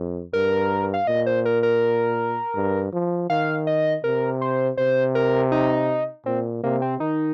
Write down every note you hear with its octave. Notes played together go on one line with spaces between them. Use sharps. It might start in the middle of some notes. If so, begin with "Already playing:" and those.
Already playing: F2
G2 A#4
F5
A#2 D#5
C5
A#4
A#4
G2
F3
D#3 F5
D#5
C3 A#4
C5
C3 C5
A#4
D#4
A#2 C4
C3 A#3
C4
D#3 D#4